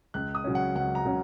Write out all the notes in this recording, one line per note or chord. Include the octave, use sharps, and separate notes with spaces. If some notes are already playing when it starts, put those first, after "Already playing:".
C#2 F#6
D#6
C#3 F#3 C#4
F#5
C#2 F#5
A#5
C#3 F#3 C#4